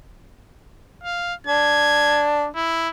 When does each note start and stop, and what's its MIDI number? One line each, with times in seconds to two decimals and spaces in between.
1.04 1.34 77
1.47 2.47 62
1.47 2.25 92
2.56 2.89 64